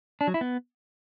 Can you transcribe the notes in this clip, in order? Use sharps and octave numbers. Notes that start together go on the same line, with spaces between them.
D4
F#3
E4
B3